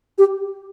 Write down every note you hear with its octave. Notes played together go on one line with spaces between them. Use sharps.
G4